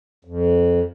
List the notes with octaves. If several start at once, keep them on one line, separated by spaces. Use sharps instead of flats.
F2